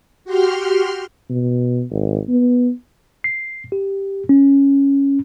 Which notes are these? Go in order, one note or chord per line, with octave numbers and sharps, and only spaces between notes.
F#4 G4 C6 F6
B2
G#1
B3
C7
G4
C#4